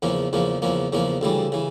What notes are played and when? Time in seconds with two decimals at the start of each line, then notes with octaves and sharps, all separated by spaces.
0.02 E2 C#3 F3 A#3
0.33 E2 C#3 F3 A#3
0.62 E2 C#3 F3 A#3
0.93 E2 C#3 F3 A#3
1.21 D2 C#3 E3 G3
1.52 C#3 E3